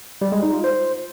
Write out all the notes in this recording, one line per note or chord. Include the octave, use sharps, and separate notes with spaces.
G3
G#3
D#4
F4
C5